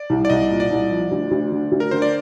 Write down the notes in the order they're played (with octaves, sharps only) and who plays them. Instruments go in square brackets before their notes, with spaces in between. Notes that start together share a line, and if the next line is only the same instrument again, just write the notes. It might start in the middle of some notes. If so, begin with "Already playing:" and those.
Already playing: [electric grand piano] D5
[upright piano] C2
[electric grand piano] D5
[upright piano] C2 [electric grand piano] D#5
[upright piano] A#2
[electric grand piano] D5
[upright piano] C2
F3
D2
D2
D3
D2
[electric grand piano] A#4
[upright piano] D3 [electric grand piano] C5
[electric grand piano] D5